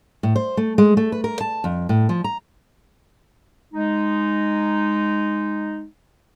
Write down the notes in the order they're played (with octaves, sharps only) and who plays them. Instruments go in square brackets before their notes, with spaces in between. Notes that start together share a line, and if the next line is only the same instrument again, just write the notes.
[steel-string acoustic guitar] A2
C5
A3
G#3
A3
B4
A#4
A5
F2
A2
F3
A#5
[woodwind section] G#3 D#4